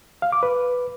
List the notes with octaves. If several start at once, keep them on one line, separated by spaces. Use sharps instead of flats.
F5
D6
B4